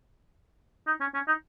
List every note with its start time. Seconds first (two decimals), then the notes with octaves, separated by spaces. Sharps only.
0.87 D#4
1.00 C#4
1.14 C#4
1.28 D#4